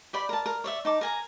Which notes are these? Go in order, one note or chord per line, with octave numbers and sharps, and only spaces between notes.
G4 D5 G5 B5
A#4 A5
A#4
C#5 D5 E5
D#4 A5 D6
A#4 G#5 A#5